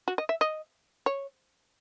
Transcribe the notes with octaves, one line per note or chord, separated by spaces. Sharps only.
F#4
D#5
E5
D#5
C#5